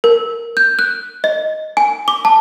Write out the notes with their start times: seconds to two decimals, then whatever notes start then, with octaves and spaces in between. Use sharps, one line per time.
0.04 A#4
0.57 G6
0.79 F#6
1.24 D#5
1.77 G#5
2.08 D6
2.25 A5